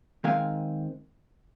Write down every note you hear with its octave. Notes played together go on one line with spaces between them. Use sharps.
D#3 G#3 C4 F5 G#5